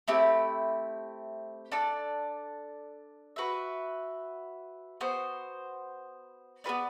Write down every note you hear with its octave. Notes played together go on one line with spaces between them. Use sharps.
A3 C4 E4 G4
D4 A4 D5
F#4 B4 E5
B3 F#4 C5
B3 F#4 B4 D5